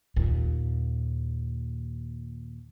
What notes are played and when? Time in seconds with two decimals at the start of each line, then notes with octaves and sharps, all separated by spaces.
0.16 D#2 A#2